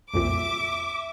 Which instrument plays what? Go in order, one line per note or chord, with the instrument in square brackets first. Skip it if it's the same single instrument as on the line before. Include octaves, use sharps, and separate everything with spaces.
[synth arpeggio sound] C2 F2 A#2 [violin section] E5 D6